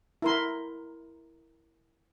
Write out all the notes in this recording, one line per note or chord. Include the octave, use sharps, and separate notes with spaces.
E4 A#4 C6